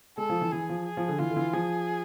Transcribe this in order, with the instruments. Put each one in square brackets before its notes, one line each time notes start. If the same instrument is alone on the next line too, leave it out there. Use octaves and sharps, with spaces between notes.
[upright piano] G#3 [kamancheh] A4
[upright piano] F3
E3
[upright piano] E3 [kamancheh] G#4
[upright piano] F3
[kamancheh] G#4
[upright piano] F3
D3
[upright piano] E3 [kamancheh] F4
[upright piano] D3
E3
[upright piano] F3 [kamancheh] G#4